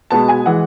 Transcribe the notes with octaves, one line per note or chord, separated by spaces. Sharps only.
B2 G#3 B3 A5
G#5
E3 G#3 F#5